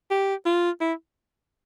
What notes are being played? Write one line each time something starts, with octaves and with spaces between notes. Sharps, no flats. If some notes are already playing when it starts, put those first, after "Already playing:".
G4
F4
E4